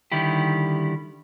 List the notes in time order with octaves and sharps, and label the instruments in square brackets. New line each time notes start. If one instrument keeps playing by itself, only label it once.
[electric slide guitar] D3 D#3 G3 E4 G4